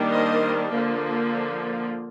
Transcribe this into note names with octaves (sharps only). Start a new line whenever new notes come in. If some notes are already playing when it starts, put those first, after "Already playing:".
Already playing: D#3 G3 A#3 D4
C5 D#5
D3 F3 A#3